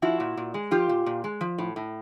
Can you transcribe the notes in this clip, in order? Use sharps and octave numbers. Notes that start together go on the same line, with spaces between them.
F3 E4 F#4
A#2
A#2
G#3
F3 F4 G4
A#2
A#2
G#3
F3
A2
A2